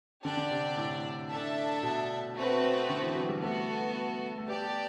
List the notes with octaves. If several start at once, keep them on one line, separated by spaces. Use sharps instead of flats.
D3 D4 G4 D5
D3
C3
A2
D4 A4 E5 A5
B2
A3 C4 F#4 B4
D3
E3
F#3
G3
A3 B3 F#4 A4
A3
B3 G4 D5 A5